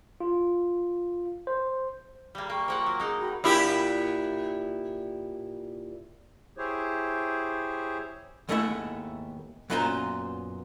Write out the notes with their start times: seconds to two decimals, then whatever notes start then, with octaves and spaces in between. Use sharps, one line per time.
0.20 F4
1.47 C5
2.35 G3 A#3 B5
2.50 A#3 G5 C#6 F6
2.68 F3 A#3 F#5
2.86 F#3
3.00 G#3 D#4
3.20 F#4 G5 B5
3.44 A#2 E4 G4
6.58 E4 G4 G#4 C5 C#5
8.49 D#2 G#2 A3 B3 E4 E5
9.70 F#2 A#2 B3 F4 C5 A#5